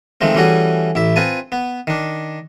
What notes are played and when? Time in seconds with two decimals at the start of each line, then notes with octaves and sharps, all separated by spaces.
0.21 D#3 F3 G#3 A3 C4
0.35 E3 G3 A3 C#4 F#4 G#4
0.95 A1 E4 E5
1.16 C4 F4 B4 G#5 A5
1.52 B3
1.87 D#3 D4